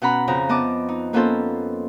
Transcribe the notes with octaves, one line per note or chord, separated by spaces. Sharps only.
B2 C#4 F#5 A#5 B5
F2 C#3 F3 A#5
B3 D#5 A5 D6
D#4
A#3 B3 C#4 F4 A4 C5